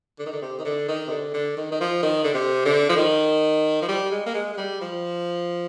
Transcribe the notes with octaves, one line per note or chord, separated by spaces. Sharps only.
D3
D#3
D3
C3
D#3
D3
D#3
C3
D3
D3
D#3
D#3
F3
D#3
D3
C3
D3
F3
D#3
F3
G3
G#3
A#3
G#3
G#3
G3
F3